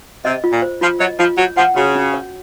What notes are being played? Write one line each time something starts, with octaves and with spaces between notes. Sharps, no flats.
C3 D#5
F4
A#2
C5
F3 F4
F#3 D#5
F3 F4
F#3 C#5
F3 F#5
C#3 F#4
C#4
C#5